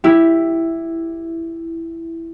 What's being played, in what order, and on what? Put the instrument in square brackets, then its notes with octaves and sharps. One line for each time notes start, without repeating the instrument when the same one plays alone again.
[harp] E4 G4